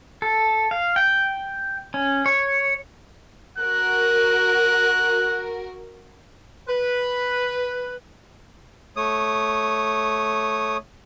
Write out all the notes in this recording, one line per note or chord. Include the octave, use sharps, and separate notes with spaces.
A4
F5
G5
C#4
C#5
F#4 A#4 F#6
B4
A3 C#5 D#6